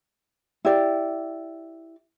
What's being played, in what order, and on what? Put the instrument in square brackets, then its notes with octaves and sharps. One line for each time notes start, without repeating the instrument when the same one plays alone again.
[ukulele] E4 G4 D5